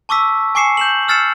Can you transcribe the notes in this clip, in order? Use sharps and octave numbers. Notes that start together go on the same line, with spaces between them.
A5 C#6 D6 E6 B6
G#5 C#6 D6 C7 C#7 E7
G6 E7 F#7
E6 F6 A6 C7 C#7 E7